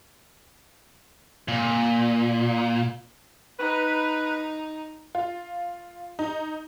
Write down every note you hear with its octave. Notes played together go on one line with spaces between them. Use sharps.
A#2
D#4 B4
F4
D#4